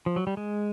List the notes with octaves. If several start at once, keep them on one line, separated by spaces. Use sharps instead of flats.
F3
F#3
G3
G#3